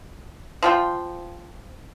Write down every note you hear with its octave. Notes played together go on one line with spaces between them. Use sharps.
F3 F4 G5